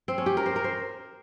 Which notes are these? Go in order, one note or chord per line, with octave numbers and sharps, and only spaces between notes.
C4
C#4
G4
A#4
C5
A#4
C5